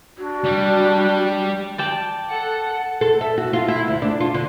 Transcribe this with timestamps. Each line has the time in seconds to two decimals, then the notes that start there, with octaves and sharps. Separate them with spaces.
0.18 D4 F#4
0.44 G3
1.78 D5 G5 A5
2.31 A4 F#5
3.01 A4
3.21 E5
3.38 F#4
3.53 F4
3.68 E4
3.88 D2
4.02 D4
4.20 F4
4.34 D3